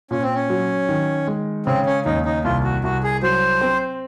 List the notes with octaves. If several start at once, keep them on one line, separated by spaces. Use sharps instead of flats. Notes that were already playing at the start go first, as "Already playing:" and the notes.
A#2 C#4
C4
C#4
F#3
D#3
G#3
C#3 C4
C#4
D#2 D#4
D#4
C2 F4
F#4
C2 F#4
G#4
F#3 C5
C4